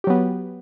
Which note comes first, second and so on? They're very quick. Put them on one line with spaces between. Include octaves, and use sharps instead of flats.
G4 F#3 B3